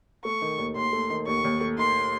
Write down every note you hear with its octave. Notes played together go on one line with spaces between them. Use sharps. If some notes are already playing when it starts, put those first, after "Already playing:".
A3 C#6
D#3
D#2
D#2 C6
A3
D#3
D#2 C#6
D#2
A3
D#3 C6